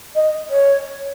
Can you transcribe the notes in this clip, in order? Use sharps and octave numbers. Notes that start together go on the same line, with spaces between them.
D#5
C#5